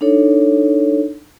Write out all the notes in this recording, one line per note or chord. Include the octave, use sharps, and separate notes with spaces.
D4 D#4 A4 C#5